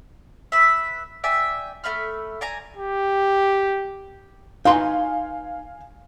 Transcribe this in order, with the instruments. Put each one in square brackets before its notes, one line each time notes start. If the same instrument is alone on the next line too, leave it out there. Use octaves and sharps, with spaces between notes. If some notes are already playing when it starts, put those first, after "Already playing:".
[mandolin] B4 E5
D5 E5 G5 G#5
A3 E5 B5 F6
D5 G#5 A#5
[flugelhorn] G4
[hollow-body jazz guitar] D#4 B4 C6 [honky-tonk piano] F5 G#5